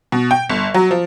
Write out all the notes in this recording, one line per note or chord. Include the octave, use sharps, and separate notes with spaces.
B2
G5
G1
F#3
F3